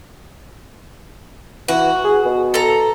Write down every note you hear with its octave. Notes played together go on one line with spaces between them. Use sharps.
E3 F#4
G#4
B2
A4 A#5